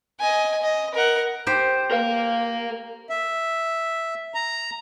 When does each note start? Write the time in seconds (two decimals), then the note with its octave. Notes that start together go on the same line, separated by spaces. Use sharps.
0.20 D#5 G#5
0.62 D#5
0.94 A#4 F#5
1.47 G4 C5
1.91 A#3 A#4 F5
3.10 E5
4.35 A#5